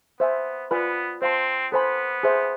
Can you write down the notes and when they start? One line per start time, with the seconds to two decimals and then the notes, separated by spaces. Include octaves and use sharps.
0.20 B3 C5 E5 G#5
0.71 B3 F4 B4 D5 G#5 B5
1.22 C4 C5 F5 A5 C6
1.72 B3 A4 C5 G#5 B5
2.23 G#4 C5 E5